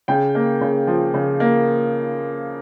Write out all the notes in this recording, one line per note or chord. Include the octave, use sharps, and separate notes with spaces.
C#3 G5
A#3
C#3
F3
C#3
A#3